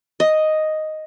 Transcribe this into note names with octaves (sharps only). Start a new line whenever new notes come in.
D#5